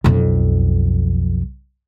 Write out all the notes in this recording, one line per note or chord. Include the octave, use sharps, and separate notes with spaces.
B1 F2